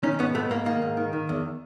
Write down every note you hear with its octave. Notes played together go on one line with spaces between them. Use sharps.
D#3 C#4 D#4
G#2 B3 C#4
G#2 A3 B3
G#2 A#3
D#3 A#3
G#2
D#3
D#3
E2